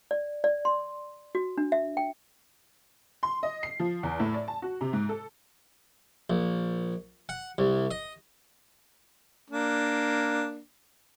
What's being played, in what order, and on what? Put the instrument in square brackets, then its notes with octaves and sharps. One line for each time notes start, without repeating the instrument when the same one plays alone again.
[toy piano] D5
D5
C6
F#4
D4
E5
G5
[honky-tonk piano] C6
D#5
C7
F3
E2
A2
D5
A5
F#4
C3
G#2
A4
[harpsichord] A#1
F#5
C2
D#5
[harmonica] A#3 D4